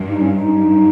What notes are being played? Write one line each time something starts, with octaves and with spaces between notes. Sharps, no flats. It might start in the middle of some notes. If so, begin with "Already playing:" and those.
Already playing: G2
D#4
C#4
D#4
G2